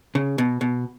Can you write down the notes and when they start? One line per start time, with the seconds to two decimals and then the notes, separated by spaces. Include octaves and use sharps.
0.15 C#3
0.38 B2
0.61 B2